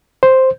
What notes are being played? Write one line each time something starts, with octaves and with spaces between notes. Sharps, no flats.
C5